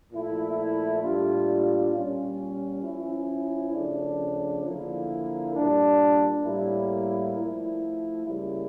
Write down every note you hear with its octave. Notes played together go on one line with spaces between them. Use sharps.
A#2 F3 A3 E4
A2 G3 A#3 D4 F4
A#2 G3 C#4
F3 C#4 E4
C#3 F3 A3 D4
D3 F3 A#3 E4
A#2 G3 D4
A2 G3 A#3 E4
F3 A3 E4
C#3 G3 A#3 E4